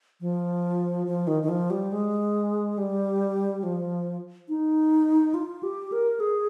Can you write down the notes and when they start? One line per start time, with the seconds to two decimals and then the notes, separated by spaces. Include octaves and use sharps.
0.21 F3
1.07 F3
1.27 D#3
1.43 D#3
1.49 F3
1.70 G3
1.92 G#3
2.78 G3
3.63 F3
4.49 D#4
5.34 F4
5.63 G4
5.92 A#4
6.20 G#4